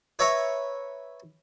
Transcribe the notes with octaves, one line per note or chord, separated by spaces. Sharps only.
B4 C#5 E5 A#5 C#6